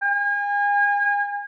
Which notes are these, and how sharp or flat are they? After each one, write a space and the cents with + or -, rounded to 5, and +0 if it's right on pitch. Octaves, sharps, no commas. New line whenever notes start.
G#5 -35